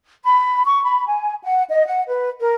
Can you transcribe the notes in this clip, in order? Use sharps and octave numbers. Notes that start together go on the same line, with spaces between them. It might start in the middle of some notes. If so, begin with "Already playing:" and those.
B5
C#6
B5
G#5
F#5
D#5
F#5
B4
A#4